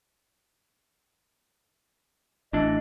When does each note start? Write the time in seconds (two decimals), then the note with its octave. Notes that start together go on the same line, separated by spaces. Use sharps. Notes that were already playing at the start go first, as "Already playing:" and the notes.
2.53 A1 E3 D4 D#5